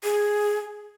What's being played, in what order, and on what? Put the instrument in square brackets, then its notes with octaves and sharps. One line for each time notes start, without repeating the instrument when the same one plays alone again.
[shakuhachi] G#4